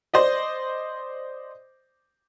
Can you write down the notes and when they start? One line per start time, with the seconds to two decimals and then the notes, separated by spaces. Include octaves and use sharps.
0.14 C5 D5 D#5